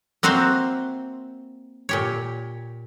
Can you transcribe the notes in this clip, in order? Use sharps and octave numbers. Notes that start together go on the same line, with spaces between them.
A#3 C4 F#4 C5 E5 F5
A#2 G4 C#5